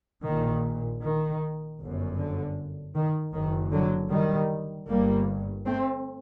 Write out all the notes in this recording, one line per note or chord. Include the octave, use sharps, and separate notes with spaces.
A#1 A#2 D#3
D#3
G1 F#2
D3
D#3
F#1 F#2 D#3
D3 F#3
D#3 G3
G1 G2 G3 A#3
A3 C4